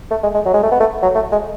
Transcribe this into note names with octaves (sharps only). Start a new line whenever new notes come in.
A3
G#3
G#3
F#3
G#3
A3
B3
A3
F#3
A3
G#3